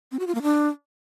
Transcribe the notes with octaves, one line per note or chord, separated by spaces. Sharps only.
C4
F#4
F4
A#3
D4